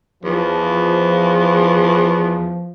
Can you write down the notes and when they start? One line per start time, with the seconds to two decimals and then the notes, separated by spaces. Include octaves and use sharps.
0.24 E2 F3